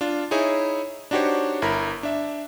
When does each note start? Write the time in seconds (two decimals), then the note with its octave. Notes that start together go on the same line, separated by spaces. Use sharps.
0.01 D4 F4
0.31 D#4 E4 G#4 C#5
1.11 D4 D#4 F#4 G4 C5 C#5
1.62 G1 E4 A#4 A#5 B5
2.03 D4 E5